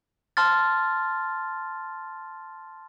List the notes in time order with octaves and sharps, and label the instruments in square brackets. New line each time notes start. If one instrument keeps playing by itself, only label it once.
[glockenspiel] A5 C6 F6 A6